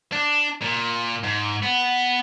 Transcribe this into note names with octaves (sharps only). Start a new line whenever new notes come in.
D4
A#2
G#2
B3